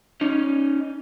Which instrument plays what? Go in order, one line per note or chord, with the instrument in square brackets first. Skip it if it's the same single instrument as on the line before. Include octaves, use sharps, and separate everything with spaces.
[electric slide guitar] C#4 D#4